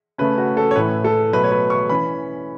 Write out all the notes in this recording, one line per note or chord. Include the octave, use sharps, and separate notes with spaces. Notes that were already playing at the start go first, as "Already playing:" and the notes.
C#3 A3 C#4 B4
F#4
A4
C#5
A2 E3 A3 B4
A4
B2 F#3 A3 B4
C#5
B4
C#6
E3 C#4 B5